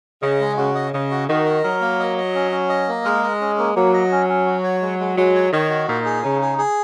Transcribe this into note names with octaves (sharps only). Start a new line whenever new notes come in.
C#3 D#5
G#3
C#3 F#4
D#5
C#3 D#5
F#4
D#3 F#4
D#5
F#3 A#4
A#3
D#5
D#5
C#4
C#4
D#5
A#3
G#3 A#4
D#5
C#4
A#3
F#3 A#3
D#5
C#4
C#4
F#4
C#5
G#3
G#3
F#3 G#3
C#5
D#3 C#5
F#4
A#2 D#4
G#4
C#3 D#4
G#4
G#4